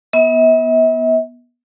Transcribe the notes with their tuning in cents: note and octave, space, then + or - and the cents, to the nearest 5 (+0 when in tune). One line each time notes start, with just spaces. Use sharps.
B3 -20 E5 -40